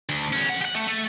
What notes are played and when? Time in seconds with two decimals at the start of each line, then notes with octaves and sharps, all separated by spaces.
0.09 D2
0.33 E2 C#4
0.49 F2 F#5
0.61 G4 F#5
0.75 A3
0.88 A3